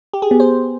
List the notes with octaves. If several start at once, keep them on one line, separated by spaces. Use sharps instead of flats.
G4
G#4
B3
C5